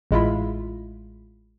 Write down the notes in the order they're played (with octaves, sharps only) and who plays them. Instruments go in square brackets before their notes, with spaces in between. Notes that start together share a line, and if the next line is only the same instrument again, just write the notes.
[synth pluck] A1 G#3 E4 F4 B5